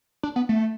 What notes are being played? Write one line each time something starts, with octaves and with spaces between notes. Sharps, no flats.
D4
B3
A3